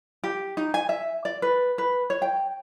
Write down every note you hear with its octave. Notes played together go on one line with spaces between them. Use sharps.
G4
D#4
G#5
E5
D5
B4
B4
C#5
G5